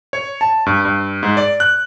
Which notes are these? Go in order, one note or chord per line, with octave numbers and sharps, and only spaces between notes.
C#5
A5
G2
G2
G#2
D5
F#6